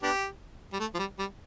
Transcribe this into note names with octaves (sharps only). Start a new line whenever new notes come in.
B3 D4 G4
G3
A3
F3
G3
G3